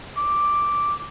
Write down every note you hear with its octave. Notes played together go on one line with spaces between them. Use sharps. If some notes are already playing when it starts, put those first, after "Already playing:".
D6